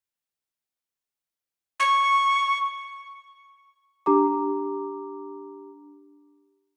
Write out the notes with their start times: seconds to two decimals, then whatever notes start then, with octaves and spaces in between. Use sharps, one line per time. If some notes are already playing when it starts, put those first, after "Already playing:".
1.80 C#6
4.06 D4 G4 A#5 D6